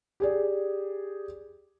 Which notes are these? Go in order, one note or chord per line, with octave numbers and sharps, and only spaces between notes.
G4 G#4 D5